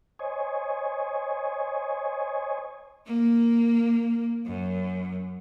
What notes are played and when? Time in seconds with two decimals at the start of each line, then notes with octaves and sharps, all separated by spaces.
0.19 C5 C#5 D#5 G#5
3.04 A#3
4.46 F#2